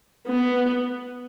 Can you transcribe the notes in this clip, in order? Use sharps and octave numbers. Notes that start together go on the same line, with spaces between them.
B3